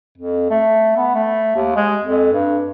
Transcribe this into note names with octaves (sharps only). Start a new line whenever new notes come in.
F2
A3
B3
A3
D#2
G#3
F2
G2